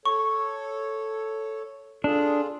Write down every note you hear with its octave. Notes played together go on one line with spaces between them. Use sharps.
A4 C#5 C#6
D4 F4 G#4 A4